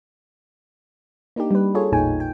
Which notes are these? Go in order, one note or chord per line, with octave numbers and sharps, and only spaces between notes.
A#3 D4 D#4 G4
G3 B4
F4 G#4 A4 C#5
A1 E2 A#2 D#4 G5 G#5
G5